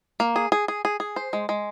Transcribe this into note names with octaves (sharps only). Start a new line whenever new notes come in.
A#3
G#4
G#4
G#4
G#4
G#4
C5
G#3
G#3